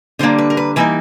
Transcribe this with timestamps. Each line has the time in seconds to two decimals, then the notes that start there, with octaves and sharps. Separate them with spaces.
0.19 D3 G3 A#3 D4 C5
0.38 B4
0.50 A#4
0.57 B4
0.76 E3 G3 A#3 D#4 B4